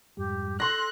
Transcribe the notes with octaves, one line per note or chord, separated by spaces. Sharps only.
F2 G#2 G3 G4
A4 C6 F#6 A#6